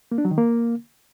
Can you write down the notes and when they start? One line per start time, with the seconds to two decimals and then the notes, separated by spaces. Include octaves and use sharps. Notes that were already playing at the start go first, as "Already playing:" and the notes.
0.12 A#3
0.18 D4
0.25 F#3
0.31 D#3
0.38 A#3